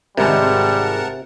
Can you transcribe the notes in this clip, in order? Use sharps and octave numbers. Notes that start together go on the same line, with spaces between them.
G#1 C3 G3 G#3 A#4 F#5 A5